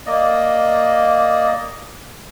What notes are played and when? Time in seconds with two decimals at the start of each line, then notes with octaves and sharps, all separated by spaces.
0.06 A#3 D5 D#5